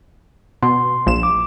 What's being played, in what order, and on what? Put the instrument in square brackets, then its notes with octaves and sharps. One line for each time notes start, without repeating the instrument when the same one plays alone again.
[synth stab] B2 [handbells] C6
[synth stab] A#1 E7
[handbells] D6